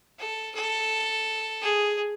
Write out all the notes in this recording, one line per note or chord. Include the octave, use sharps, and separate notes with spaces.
A4
A4
G#4